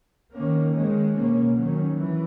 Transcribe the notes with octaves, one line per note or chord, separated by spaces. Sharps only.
D#3 A#3 C#4
D#3 G#3 C#4
B2 A#3 C#4
D#3 F#3 C#4
E3